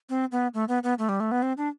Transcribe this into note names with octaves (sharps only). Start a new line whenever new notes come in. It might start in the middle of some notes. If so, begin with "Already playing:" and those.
C4
B3
A3
B3
B3
A3
G3
A3
B3
C4
D4